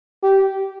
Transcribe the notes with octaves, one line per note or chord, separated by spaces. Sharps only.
G4